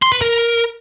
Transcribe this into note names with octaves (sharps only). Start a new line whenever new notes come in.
C6
B4
A#4